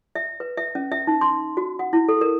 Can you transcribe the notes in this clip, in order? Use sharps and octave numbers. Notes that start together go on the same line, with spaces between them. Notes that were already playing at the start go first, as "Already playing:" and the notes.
E5
B4
E5
C#4
E5
D#4
C6
F#4
F#5
E4
A4
A#4